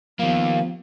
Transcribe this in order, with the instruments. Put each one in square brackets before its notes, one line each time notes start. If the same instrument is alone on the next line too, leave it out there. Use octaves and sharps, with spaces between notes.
[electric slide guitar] D#3 A#3 [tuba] F3 [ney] B3 [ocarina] F5